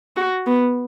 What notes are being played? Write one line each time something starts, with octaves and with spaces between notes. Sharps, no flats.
F#4
B3